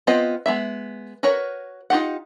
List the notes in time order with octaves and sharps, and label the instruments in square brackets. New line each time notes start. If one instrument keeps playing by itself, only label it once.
[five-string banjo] B3 C4 F4 B4 D#5
G#3 B3 E5
F#4 A#4 B4 C#5
D#4 F4 G4 F#5